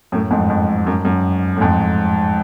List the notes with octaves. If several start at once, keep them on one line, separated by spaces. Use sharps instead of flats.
F#2 A2
F2 G#2
F2
F#2
F#2
A2
F2 G#2